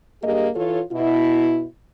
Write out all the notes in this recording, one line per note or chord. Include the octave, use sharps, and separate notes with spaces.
G2 A#3 G4 G#4 D#5
E3 F4 A4 C#5
B2 E4